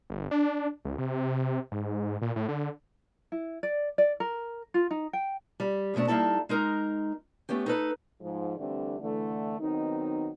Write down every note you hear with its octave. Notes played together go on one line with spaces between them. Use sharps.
G1
D4
C#2
C3
G#2
A#2
A2
D3
E4
D5
D5
A#4
F4
D#4
G5
G3
D2 G#2 B2 A3 D4
G3 A#3 D#4 E4 A4 A5
G#3 D#4 A#4
A3 B3 C#4 G4
D#4 A4 B4
G#2 F3
D3 E3 G3 A3 C4 D4
D3 E3 A3
D#3 F#3 B3 C4 D#4